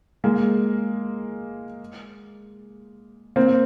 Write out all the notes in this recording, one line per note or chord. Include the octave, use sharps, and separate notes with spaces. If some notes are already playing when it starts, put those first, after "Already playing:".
G#3 A#3
A#3 C4